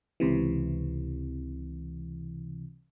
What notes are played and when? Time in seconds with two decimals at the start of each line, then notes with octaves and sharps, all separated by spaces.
0.20 C#2 C3 E3